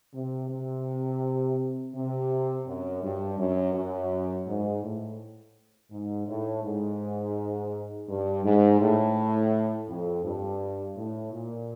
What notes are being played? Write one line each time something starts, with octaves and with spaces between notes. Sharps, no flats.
C3
C3
C3
F#2
G2
F#2
F#2
G#2
A2
G#2
A2
G#2
G2
G#2
A2
F2
G2
A2
A#2